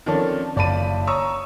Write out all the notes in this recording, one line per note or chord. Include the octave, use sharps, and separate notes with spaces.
D#3 F3 C4 C#4 A4 D5
F#1 D5 A5 B5 D#7
C#5 A#5 C#6 D#6 E6